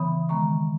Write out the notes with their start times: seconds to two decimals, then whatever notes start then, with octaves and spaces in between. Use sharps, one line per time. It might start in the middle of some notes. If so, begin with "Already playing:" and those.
Already playing: C#3 E3 B3 B5 D#6
0.29 D#3 G#3 B3 A#5 C#6